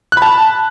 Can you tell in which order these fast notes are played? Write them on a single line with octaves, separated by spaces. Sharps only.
F#6 B5 A5